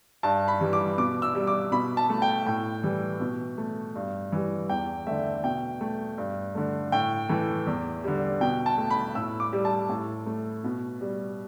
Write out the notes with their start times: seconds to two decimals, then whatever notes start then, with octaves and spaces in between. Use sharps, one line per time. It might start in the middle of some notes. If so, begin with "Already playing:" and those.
0.23 G2 A5
0.48 B5
0.61 E3 G3
0.73 D6
0.98 B2 D6
1.22 E6
1.35 G3
1.47 D6
1.72 B2 B5
1.97 A5
2.10 A3
2.22 G5
2.46 A2 G5
2.84 E3 G3
3.20 B2
3.58 A3
3.95 G2
4.32 E3 G3
4.69 E2 G5
5.07 D3 A3 E5
5.44 B2 G5
5.81 A3
6.18 G2
6.55 D3 A3
6.92 A2 G5
7.29 E3 A3
7.67 E2
8.04 D3 G3
8.41 B2 G5
8.66 A5
8.78 A3
8.90 B5
9.15 A2 E6
9.40 D6
9.53 G3
9.65 A5
9.89 A2
10.26 A3
10.64 B2
11.01 G3